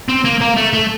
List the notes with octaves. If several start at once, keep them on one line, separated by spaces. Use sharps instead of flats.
C4
A#3
A#3
A3
A3